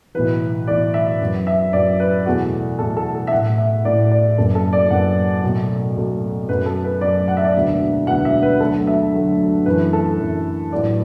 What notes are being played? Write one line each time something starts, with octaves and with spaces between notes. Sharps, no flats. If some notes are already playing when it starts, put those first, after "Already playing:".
B1 A2 E3 B4
B1 A2 E3 D5
E5
F#2 F#3 B3
E5
F#2 F#3 B3 D5
B4
E2 B2 A3 F#4
E2 B2 A3 A4
A4
A4
E5
A1 A2 A3 F#5
E5
A1 A2 A3 D5
D5
F#1 F#2 F#3 B3 A4
A4
D5
F#1 F#2 F#3 B3 F#5
B1 B2 A3
B1 B2 A3
F#2 F#3 A3 B4
A4
B4
F#2 F#3 A3 D5
F#5
E5
D5
E1 D2 D3 B3 E5
E1 D2 D3 B3 F#5
E5
B4
D2 D3 F#3 A3 A4
E5
D2 D3 F#3 A3
F#2 E3 A3 B4
A4
F#2 E3 A3
A1 A2 F#3 B3 D5